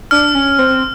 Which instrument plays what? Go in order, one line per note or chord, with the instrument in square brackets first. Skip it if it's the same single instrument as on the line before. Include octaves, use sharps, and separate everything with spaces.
[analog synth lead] D4 [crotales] F6
[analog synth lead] C#4
C4